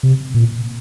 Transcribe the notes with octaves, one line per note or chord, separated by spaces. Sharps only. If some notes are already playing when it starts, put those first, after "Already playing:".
C3
A#2